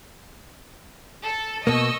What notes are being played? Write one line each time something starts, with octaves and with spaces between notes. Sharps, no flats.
A4
B2 A#3 D#5 C#6 E6